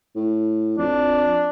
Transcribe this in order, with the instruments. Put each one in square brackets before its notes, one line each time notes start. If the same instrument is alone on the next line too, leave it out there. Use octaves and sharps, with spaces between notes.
[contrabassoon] A2
[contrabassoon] F2 [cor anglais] D4